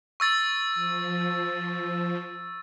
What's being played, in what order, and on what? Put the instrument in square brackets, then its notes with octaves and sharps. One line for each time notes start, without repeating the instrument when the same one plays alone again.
[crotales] C#6 E6 A6
[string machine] F3